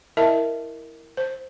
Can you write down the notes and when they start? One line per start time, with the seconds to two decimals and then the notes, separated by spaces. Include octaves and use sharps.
0.17 E4 A#4 D#5 E5 A5
1.17 C5